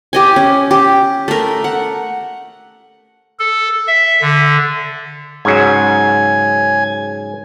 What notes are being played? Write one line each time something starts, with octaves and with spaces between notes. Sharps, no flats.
G4 D#5 G#5
C#4
G4
A3 A#4
F#5
A4
E5
D3
G#2 C#3 F#3 G#5